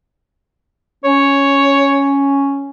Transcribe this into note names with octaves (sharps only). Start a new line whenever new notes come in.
C#4 C#5